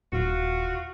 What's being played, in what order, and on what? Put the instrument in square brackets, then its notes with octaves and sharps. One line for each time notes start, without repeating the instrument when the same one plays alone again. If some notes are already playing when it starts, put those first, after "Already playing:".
[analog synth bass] D#1 [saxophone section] F4 F#4